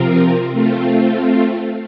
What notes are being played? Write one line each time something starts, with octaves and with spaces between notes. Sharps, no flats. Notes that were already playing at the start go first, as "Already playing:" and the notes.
Already playing: C3 F3 C4 F4 A#4
A3 C4 F4